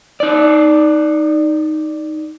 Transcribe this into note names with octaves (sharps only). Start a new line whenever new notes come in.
D#4 D5